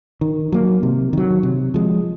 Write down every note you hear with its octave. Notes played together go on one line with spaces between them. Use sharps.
D#3
F#3 A#3
C3
D#3 F#3
C3
F3 G#3